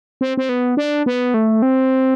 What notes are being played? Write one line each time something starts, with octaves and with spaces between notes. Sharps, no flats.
C4
C4
B3
D4
B3
A3
C4